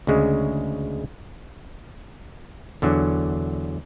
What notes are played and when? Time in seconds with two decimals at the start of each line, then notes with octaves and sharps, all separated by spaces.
0.07 D2 C#3 G#3
2.82 E2 D3 F#3